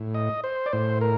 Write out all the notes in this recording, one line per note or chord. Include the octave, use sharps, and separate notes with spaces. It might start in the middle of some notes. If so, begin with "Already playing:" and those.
Already playing: A2
D#5
C5
D5
A2 C5
A#4